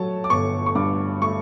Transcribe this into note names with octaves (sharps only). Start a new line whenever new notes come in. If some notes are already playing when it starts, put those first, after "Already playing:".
Already playing: F#3 A3 C#5 A5
D6
G1 C#6
C#6
G2 D6
A3 C#6